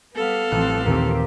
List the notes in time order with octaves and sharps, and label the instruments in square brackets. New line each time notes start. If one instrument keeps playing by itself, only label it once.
[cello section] G3 B3 [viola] A4 F5
[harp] A1 F#6 [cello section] F3 G3 C4
[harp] D#2 A#2 [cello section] C4 G4